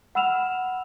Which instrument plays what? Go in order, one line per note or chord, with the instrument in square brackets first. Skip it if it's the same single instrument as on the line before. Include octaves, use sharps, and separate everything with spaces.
[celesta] F#5 B5 E6 F6 E7 F7